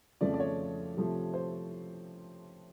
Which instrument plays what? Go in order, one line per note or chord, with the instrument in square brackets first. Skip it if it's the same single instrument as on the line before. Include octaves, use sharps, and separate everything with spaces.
[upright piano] F2 C#3 F3 A3 C4 D5
D5
C#5
C3 F3 A3
C5